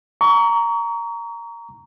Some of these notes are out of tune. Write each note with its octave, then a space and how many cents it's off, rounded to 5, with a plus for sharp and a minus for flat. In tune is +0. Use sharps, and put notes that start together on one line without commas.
A#5 +0 C#6 +35